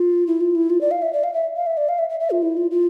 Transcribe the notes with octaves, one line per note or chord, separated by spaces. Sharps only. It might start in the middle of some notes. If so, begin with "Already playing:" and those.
Already playing: F4
E4
F4
E4
F4
D5
F5
E5
D5
F5
E5
F5
E5
D5
F5
E5
E5
E5
F4
E4
F4
F4